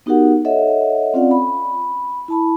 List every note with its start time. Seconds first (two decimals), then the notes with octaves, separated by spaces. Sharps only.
0.06 B3 D#4 F#4 G4 A#4 F#5
0.45 A4 C#5 D#5 E5 F#5
1.14 C4 C#4 F4 D5 F5 F#5
1.31 B5
2.28 E4 A5 B5